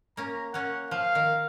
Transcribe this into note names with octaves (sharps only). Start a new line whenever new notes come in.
A#3 C#4 A#5
A#3 C#4 F#5
F3 F5
D#3